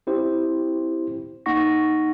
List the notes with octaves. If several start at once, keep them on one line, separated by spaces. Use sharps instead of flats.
C4 E4 G4 C5
A#3 D#4 F#5 C#6 A#6